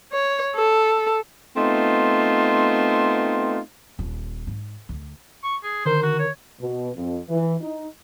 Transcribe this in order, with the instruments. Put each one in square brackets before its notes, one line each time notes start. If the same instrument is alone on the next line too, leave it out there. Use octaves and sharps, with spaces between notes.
[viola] C#5
A4
[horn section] A3 B3 C4 D#4 F4
[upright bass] D#1
G#2
D2
[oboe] C#6
G#4
[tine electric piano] D3 D#3 A#4 [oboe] C5
[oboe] F#4
C#5
[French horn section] B2
F2
E3
D#4